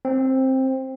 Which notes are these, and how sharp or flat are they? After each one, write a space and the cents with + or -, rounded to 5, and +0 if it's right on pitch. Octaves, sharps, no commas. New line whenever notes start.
C4 +10